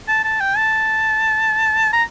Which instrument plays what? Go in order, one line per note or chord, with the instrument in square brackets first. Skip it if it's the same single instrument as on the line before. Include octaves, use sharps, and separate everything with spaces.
[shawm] A5
A5
G5
A5
A#5